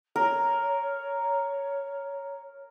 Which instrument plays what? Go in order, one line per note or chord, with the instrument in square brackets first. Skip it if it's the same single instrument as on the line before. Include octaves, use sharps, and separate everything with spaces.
[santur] A#4 [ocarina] C#5